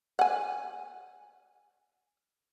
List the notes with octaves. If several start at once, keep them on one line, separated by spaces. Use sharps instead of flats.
F#5 G#5